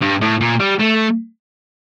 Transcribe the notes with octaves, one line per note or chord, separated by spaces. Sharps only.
G2
A2
A#2
G3
A3